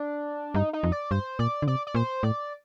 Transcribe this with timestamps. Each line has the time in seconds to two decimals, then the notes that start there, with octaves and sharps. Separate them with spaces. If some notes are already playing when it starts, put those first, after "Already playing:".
Already playing: D4
0.54 G2 D#4
0.73 D#4
0.83 F2
0.92 D5
1.11 G2 C5
1.39 A#2 D5
1.62 D3
1.67 C3 D5
1.87 D5
1.95 A#2 C5
2.23 A2 D5